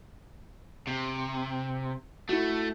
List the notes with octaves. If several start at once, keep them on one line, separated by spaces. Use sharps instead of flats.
C3
A3 E4 F#4